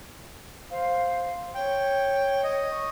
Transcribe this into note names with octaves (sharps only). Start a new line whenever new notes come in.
C5 F5
C#5 G5
D#5
C#6